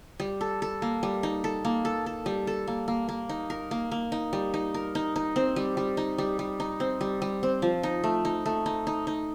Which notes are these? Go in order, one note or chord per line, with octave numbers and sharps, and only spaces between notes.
G3
A4
A4
A#3
G3
D#4
A4
A#3
A4
A4
G3
A4
A#3
A#3
A#3
D#4
A#4
A#3
A#3
D#4
G3
D#4
A#4
D#4
D#4
C4
G3
G3
D#4
G3
G3
D#4
C4
G3
G3
C4
F3
D#4
A3
D#4
A3
D#4
D#4
D#4